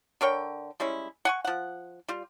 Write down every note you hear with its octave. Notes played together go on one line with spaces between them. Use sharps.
D3 A#4 C#5 G5
G3 G#3 C#4 E4
F#5 G#5 C#6
F3 F#5
G3 F4